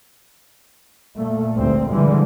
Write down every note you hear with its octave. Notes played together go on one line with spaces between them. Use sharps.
A#2 A3
G1 D2 G#2 C4
D3 E3 F3 G3 G#3